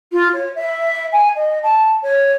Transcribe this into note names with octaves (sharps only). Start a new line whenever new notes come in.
F4
C#5
E5
G#5
D#5
A5
C#5